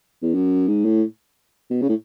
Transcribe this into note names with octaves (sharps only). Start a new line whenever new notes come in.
E2
F#2
G#2
A2
B2
C#3
A2